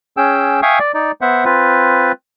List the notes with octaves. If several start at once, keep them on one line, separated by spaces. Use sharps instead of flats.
C#4 G#4 G5 E6
E5 F5 G5 G#5 C#6 D#6
D5
D#4 D5
B3 C5 E5 F#5
C4 F4 B4